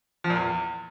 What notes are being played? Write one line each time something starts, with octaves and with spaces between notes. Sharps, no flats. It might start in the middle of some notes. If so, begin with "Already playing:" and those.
F3
A#2
E2